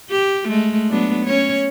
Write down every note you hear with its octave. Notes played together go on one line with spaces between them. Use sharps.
G4
G#3 A3
F#3 B3 D4
C#4 C#5